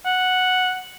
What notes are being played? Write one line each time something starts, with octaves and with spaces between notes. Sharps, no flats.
F#5